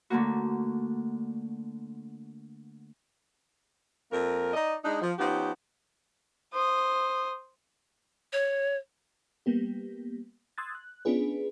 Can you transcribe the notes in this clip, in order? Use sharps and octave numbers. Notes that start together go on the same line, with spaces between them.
D3 A3 A#3 F#4
F2 A#3 A#4
D#4 D5 D#5
G#3 D4 D#4
F3
F3 B3 C#4 D#4 G4
C5 D#6
C#5
G3 A#3 B3 G4
C6 D#6 E6 F#6 G#6 A6
F#6
B3 C#4 D4 F4 G#4 B4